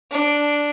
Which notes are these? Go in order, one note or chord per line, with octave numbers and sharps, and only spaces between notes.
D4